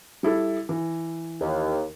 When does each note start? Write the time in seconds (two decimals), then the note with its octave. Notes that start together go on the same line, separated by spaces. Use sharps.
0.23 G3 E4 A4
0.69 E3
1.41 D#2